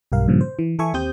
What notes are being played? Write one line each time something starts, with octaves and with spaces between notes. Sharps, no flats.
B1 G2 G4 A#4 F5
G2 A#2 C#3 F3
C5
E3
E3 A4 E5 G#5 C#6
D#2 C4 G4 C5 D#6 G6